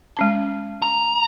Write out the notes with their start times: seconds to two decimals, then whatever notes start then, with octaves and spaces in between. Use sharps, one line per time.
0.17 G#3 C#4 A5
0.82 A#5